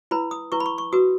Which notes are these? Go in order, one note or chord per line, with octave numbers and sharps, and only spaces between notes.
E4 B4 B5
D#6
E4 B4 C#6
B5
C#6
C#6
F#4 B4 D#6